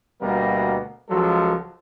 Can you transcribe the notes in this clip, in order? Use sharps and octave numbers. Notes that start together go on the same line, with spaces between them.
D2 B2 G3 A#3 B3 A#4
C#2 F3 F#3 G#3 F#4 A4